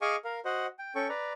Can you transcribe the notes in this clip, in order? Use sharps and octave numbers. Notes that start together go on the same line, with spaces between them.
G#4 D#5 F5 G#5 C#6 D6
A#4 F5
F#4 C5 D#5 F#5
G5
C#4 A4 G5 C#6
B4 D5 A#5